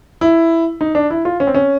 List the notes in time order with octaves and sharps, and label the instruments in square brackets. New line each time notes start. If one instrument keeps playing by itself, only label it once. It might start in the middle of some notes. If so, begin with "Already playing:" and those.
[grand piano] E4
D#4
D4
E4
F4
C#4
C4
C#4